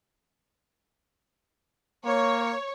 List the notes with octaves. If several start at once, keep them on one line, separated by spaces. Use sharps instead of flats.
A#3 C#5